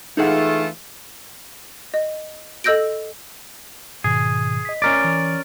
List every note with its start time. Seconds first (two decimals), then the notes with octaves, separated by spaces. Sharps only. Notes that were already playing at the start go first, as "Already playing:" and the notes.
0.17 E3 A3 D#4 F4 G#4 F#5
1.94 D#5
2.64 A4 D#5 E6 G6 A#6 D7
4.04 G#2 B2 D#3 G#4
4.65 D#5 B6
4.82 C#4 A#4 D5
5.04 E3